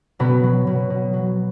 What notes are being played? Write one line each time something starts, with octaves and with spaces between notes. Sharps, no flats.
B2 F#3 B3
F#3
B2
B2
F#3